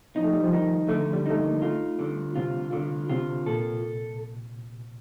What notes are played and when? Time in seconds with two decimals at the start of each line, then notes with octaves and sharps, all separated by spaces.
0.15 F3 D#4
0.24 A3
0.33 G3
0.42 F3
0.52 D#3 D#4
0.88 D3 A3
1.13 G3
1.26 A3 D#4
1.38 A#3
1.62 A3 F4
1.99 D3 G3
2.36 C3 F4
2.72 D3
3.10 C3 F4
3.46 A#2 A4